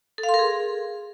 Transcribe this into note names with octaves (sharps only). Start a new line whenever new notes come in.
A4
F5
C6
A#4
G#4